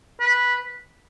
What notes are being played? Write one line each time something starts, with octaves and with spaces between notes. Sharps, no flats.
B4